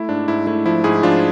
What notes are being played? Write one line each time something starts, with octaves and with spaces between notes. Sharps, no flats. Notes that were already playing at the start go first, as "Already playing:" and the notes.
Already playing: A3 E4
G#2 D4
G#2 E4
A3 E4
F3 E4
G#2 E4 G#4
F3 D4 F4